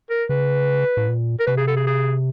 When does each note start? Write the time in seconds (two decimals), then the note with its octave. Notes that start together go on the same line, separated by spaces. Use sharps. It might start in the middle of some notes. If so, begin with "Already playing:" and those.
0.10 A#4
0.29 C#3 B4
0.97 A2
1.08 A#2
1.40 A#4
1.47 C3 B4
1.57 G#4
1.67 A4
1.76 G#4
1.87 G#4